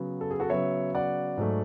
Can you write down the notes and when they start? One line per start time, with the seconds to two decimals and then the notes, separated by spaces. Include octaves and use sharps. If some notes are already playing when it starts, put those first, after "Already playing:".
Already playing: C#3 F#3 B3
0.21 A4
0.31 G#4
0.40 F#4 A4
0.50 C#3 F#3 B3 C#5 E5
0.95 D5 F#5
1.37 G#2 F#3 A3